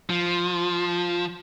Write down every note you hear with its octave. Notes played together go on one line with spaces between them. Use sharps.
F3